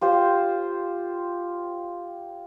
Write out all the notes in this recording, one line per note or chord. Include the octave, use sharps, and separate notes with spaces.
F4 G4 C5